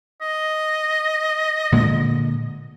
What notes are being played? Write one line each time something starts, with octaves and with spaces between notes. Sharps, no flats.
D#5
A#2 D3 G#3